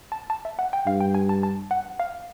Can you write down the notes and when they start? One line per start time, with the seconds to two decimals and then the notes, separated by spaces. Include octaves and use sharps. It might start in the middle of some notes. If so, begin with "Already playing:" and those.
0.12 A5
0.30 A5
0.45 E5
0.59 F#5
0.73 G5
0.86 G2 F5
1.01 G5
1.15 G#5
1.29 A5
1.43 A5
1.71 F#5
2.00 F5